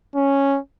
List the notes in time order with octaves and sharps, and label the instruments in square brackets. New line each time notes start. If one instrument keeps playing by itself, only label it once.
[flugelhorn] C#4